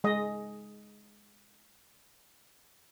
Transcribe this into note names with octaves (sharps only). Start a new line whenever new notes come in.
G#3 D#5